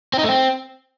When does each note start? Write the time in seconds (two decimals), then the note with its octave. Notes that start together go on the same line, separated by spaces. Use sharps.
0.14 C4
0.19 D#4
0.24 A3
0.29 C4